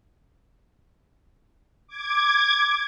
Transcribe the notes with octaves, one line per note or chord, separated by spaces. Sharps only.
D6 G#6